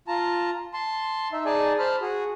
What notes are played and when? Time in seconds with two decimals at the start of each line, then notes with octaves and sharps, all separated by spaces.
0.08 F4 A5 A#5
0.74 A5 C6
1.32 D#4 E5
1.45 D#4 G#4 D5 G#5 A5
1.79 C5 A5 B5 F6
2.01 F#4 G#4